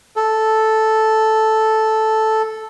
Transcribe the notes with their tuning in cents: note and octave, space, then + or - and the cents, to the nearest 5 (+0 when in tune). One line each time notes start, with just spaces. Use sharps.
A4 -5